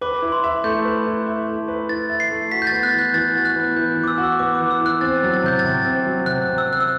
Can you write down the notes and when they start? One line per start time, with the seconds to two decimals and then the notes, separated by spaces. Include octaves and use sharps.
0.01 B4 D6
0.22 E4
0.32 C6
0.44 E5
0.64 A3 G6
0.85 B4
1.06 E4
1.27 E5
1.48 A3
1.68 B4
1.89 E4 A6
2.09 E5
2.20 C7
2.31 A3
2.51 F#4 B6
2.62 G6
2.67 B3 A6
2.83 F#6
2.93 E3
2.99 G6
3.14 E3 A6
3.35 F#4
3.45 F#6
3.56 B3
3.76 E3 G6
3.97 E3
4.04 D6
4.08 E6
4.18 F#4
4.23 E6
4.39 B3 D6
4.55 D6
4.60 E3
4.71 E6
4.81 E3 F#6
5.01 C4 A6
5.23 F#3
5.34 A6
5.43 C3 G6
5.59 A6
5.64 C3
5.85 C4
6.06 F#3
6.26 C3 F#6
6.48 C3
6.58 E6
6.69 C4 F#6
6.80 E6